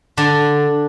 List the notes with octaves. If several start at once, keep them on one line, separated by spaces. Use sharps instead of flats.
D3 D4